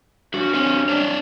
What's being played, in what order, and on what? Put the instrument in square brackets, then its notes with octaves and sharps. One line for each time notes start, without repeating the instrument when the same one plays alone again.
[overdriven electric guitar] G2 C#4 [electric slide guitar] F#4
[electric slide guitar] C4 C#5
D4 C#5 D5